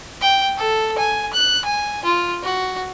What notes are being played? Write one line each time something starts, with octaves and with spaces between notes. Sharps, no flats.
G5
A4
G#5
F#6
G#5
F4
F#4